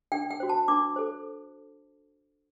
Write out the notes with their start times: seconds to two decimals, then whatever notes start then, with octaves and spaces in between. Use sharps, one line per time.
0.12 D4 G5
0.31 G5
0.40 F#4 C5
0.49 A5
0.68 D4 D6
0.96 A4 C5